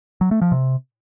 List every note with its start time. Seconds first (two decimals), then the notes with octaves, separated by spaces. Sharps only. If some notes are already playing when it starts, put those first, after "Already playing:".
0.21 F#3
0.31 A3
0.42 F3
0.52 C3